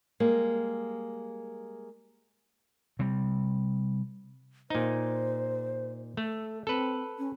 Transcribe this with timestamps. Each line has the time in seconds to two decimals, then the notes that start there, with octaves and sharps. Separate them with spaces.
0.20 G3 G#3 A#3
2.99 C3 G3
4.70 A#2 D#4 C5
6.17 A3 A4
6.67 C4 A4 B4
7.18 C#4